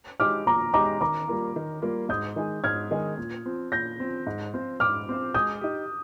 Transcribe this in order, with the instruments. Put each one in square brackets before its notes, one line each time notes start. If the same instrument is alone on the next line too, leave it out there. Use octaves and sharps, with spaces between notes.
[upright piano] G#3 D#4 G4 [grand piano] D6 F6
[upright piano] A#2 [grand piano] A#5 D6
[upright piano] G#3 D#4 G4 [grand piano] A#5 D6
[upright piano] D#3 [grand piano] A#5 D6
[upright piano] G3 A#3 F4
D#3
G3 A#3 F4
[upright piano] G#2 [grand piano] D#6 G6
[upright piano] D#3 G#3 D#4 G#4
[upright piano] G#2 [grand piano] F6 G#6
[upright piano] D#3 G#3 D#4 G#4
A#2
F3 C4
[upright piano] A#2 [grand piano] G6 A#6
[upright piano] F3 C4
G#2
F3 C4 F4 C5
[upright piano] G#2 [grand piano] D6 F6
[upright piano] F3 C4 F4 C5
[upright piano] G#3 [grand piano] D#6 G6
[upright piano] D#4 G4